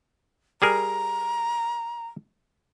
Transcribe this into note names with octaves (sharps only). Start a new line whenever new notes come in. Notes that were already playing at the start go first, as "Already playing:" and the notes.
G3 G#4 A#4 A#5